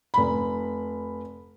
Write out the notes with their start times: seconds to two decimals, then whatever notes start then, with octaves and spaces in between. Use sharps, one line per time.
0.14 F1 B5